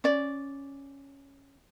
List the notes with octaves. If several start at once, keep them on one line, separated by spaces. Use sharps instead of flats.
C#4 D5